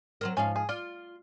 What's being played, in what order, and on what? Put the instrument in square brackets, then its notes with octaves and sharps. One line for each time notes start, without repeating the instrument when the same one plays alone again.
[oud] F#3 C4 A#4
[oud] G#2 F3 F5 [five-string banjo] C#4
[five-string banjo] G#4
[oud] F4 [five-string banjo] D5